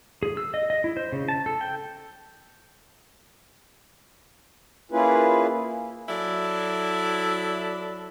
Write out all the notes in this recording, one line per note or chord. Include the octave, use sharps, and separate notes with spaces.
G#4
E6
D#5
D#5
E4
C5
C#3
A5
A4
G5
A#3 C#4 E4 F4 G#4 B4
F#3 E4 A4 D5